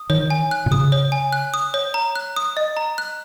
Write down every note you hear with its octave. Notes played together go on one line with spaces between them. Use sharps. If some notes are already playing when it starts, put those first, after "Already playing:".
Already playing: D#6
D#3 C#5
G#5
F#6
A#2
C#3 D#6
C#5
G#5
F#6
D#6
C#5
A#5
F#6
D#6
D#5
A#5
F#6